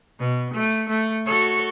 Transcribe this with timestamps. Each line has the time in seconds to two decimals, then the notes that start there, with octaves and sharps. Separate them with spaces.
0.19 B2
0.54 A3
0.88 A3
1.25 F#4 A4 C#5